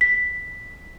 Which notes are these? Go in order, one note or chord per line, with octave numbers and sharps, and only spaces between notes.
B6